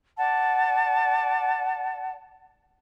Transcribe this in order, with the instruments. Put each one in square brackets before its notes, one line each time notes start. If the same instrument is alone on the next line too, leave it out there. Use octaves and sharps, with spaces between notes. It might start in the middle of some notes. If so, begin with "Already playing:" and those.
[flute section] D5 F#5 A5